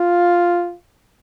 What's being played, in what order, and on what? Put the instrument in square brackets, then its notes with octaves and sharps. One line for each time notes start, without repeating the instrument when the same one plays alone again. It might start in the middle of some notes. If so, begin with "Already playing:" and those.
Already playing: [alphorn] F4